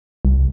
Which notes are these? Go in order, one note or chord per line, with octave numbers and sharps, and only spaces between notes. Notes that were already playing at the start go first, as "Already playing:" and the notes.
C2